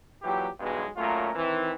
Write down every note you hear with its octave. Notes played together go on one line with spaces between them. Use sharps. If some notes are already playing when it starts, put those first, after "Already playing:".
A#2 E3 F#3 G4
B1 G2 B2 E3 G#3
A#2 F#3 A3 C#4 F4 A#4
D#3 E3 C4